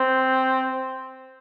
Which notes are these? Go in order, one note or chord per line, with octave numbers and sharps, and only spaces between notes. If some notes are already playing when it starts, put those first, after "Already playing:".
Already playing: C4